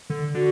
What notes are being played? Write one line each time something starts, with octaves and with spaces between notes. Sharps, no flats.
D3
D3 F#4